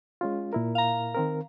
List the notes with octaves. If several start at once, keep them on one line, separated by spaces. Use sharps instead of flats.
G#3 C#4 F4
A#2 E4 A#4
F5 A#5
D#3 C4 A#4